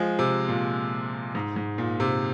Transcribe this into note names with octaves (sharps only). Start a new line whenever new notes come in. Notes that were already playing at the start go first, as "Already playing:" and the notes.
Already playing: F3 G#3
C3
A#2
G#2
G#2
A#2
C3